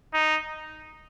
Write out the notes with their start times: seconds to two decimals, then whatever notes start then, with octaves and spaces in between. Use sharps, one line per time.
0.14 D#4